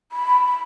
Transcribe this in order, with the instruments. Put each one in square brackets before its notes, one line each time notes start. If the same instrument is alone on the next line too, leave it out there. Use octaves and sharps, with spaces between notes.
[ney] B5